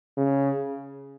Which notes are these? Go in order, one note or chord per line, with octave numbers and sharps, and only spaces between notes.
C#3